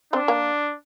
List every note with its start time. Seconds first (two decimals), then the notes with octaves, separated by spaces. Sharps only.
0.13 C4 D4 C5
0.28 A#3 A#4